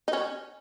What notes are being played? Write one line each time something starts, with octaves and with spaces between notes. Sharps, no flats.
D#4
C#4